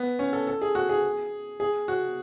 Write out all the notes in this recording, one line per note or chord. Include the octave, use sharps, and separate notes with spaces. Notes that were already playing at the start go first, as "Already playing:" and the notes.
Already playing: B3
C#4
A4
A4
G#4
F#4
G#4
G#4
F#4